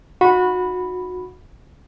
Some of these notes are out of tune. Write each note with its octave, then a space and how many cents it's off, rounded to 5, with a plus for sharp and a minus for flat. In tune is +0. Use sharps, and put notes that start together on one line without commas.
D#4 -5 F#4 -25 B5 +0